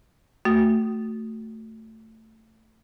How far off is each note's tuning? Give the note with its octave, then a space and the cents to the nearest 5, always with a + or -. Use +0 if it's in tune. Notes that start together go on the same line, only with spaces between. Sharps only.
A3 +10 F#4 +0